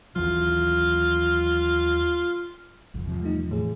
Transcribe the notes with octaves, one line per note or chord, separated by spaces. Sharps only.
D#2 E3 F#3 F4
G1 C2 F2
E2 G#2 C3 F3
G3 A3 D#4
A2 E3 G#4